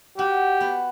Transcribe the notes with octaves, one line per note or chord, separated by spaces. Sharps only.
F#4 G4
B3